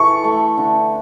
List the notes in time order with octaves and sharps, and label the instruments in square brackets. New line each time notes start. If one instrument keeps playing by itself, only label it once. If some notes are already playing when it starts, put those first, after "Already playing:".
Already playing: [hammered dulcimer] E3 A4 [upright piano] C#6
[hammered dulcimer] A3
D3